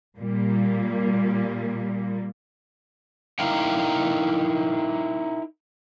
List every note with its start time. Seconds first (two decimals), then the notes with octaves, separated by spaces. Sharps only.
0.17 A#2 G3 A#3
3.39 D#4 E4 A#4 F5 G5